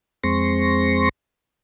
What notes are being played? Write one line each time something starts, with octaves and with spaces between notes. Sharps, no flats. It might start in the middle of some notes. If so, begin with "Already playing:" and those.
F2 G#3 C4 C6 C#6 A#6